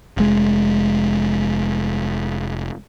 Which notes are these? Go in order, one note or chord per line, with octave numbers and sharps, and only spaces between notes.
F1 G#3